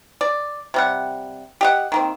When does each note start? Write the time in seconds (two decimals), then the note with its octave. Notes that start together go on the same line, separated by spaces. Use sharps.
0.21 D5
0.74 C3 G3 F#5
1.61 G4 D#5 F#5
1.92 D#3 A#3 C4